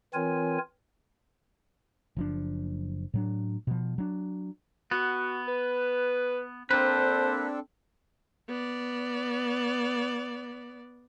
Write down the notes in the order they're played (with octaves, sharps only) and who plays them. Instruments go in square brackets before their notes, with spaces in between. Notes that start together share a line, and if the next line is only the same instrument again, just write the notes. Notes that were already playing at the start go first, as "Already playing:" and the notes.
[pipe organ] E3 C4 F4 A#4 C#5 G#5
[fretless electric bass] F#1 F3 D4
A2 F#3 D4
B2 F3
F#3 D4
[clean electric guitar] B3 [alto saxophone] F#4
[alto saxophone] B4
[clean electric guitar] A#3 B4 [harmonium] C4 D4 A4 [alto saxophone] C5
[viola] B3 D5